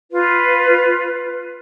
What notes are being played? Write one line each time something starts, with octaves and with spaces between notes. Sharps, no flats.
F4 B4